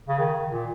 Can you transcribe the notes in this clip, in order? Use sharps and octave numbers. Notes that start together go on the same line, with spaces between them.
C#3
D#3
A#2